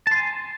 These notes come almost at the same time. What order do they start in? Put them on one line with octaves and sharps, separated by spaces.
A5 C6 G#5